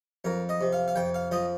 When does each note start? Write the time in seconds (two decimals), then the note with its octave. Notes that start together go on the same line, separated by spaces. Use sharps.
0.25 F2 A#4
0.49 D#5
0.61 C3
0.73 F5
0.88 F5
0.96 F2 G5
1.14 F5
1.31 F3 D#5